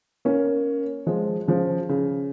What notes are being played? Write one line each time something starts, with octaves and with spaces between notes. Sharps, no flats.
A#3 C#4
F3 G#3
C#3 F3
C#3